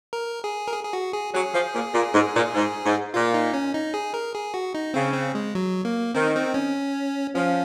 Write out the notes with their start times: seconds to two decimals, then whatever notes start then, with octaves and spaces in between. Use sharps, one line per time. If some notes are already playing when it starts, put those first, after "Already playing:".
0.13 A#4
0.44 G#4
0.68 A#4
0.74 G#4
0.84 G#4
0.93 F#4
1.13 G#4
1.34 F#3 G#4
1.53 F3
1.73 A#2
1.94 A#2
2.13 G#2
2.34 A#2
2.53 G#2
2.84 G#2
3.14 A#2 F4
3.34 D#4
3.54 C#4
3.74 D#4
3.94 G#4
4.14 A#4
4.35 G#4
4.54 F#4
4.75 D#4
4.94 C#3 C4
5.14 C4
5.35 G#3
5.55 F#3
5.85 A#3
6.14 D#3 C4
6.35 C4
6.54 C#4
7.34 F3 C#4